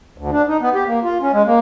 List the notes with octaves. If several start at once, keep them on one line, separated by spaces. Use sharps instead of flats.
D2
D4
D#4
B3
G4
A#3
F4
C#4
G#3
A#3